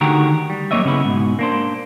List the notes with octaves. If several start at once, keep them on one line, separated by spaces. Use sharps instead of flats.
D2 D3 D#3 F#4 G4 A#5
G3
F#2 C#3 A#3 C#5 D#5 E5
C#3 B3 E4
G#2 B2
A#3 D4 C5